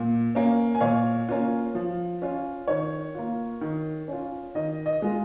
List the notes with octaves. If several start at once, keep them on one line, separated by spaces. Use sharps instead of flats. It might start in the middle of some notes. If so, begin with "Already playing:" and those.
Already playing: A#2
A#3 C#4
G#5
A#2 C#5 F5
A#3 C#4 F4
F3
C#4 F4
D#3 C#5
A#3 F4
D#3
C#4 F4
D#3 D#5
D#5
G#3 F4